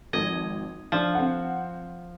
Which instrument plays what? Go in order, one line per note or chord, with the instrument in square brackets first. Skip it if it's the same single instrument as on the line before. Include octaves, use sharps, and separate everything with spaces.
[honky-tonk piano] G#1 F3 G#6 [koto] D#5
[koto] F3 [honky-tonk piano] D4
[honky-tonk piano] C4 F#5